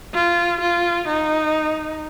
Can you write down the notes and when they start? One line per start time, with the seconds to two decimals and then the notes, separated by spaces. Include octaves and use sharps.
0.14 F4
0.61 F4
1.08 D#4